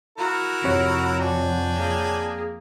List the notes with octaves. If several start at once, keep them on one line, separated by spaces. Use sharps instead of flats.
E4 F#4 A#4
F2 C3 C#5 F#5
D4 G5 G#5
A#3 G#4